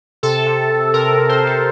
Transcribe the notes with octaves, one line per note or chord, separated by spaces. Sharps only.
C3 A4
C3
C3
C3 A#4
C3
C5
C3
A4